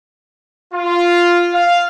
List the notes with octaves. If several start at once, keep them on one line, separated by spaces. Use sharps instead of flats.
F4
F5